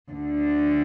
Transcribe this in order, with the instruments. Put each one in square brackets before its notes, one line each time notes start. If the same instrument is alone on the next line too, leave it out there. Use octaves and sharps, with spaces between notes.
[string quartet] D2 D3